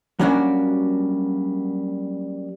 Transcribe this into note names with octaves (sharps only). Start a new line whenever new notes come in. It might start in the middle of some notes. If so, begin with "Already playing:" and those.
F#3 G3 A#3 C#4 D4 F#4